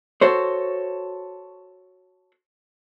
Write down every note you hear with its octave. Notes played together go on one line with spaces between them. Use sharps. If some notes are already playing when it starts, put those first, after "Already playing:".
F#4 A4 C5 C#5